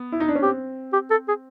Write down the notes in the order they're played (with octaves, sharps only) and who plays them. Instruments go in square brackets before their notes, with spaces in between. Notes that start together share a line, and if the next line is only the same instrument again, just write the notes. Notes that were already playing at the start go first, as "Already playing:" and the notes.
Already playing: [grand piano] B3
E4
D#4
D4
C#4
[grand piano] C4 [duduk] G4
[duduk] G4
A4
G#4